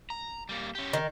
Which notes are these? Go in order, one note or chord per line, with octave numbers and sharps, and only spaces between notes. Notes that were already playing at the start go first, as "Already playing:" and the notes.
A#5
G3 A#3
C#4 G4
D#3